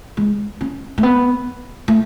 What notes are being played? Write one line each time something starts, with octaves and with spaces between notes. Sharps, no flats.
G#3
C#4
A3
B3
A3